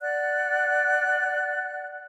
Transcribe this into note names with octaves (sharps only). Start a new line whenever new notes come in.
D5 F#5 F#6